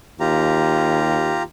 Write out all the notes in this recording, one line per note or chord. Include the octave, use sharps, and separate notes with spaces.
D#2 F4 G4 A#5